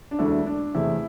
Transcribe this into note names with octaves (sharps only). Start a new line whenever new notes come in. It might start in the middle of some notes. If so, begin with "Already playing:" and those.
D4
E1 D2 D3 A3 E4
D4
E2 C3 A3 E4